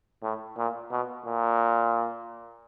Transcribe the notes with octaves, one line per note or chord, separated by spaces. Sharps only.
A2
A#2
B2
A#2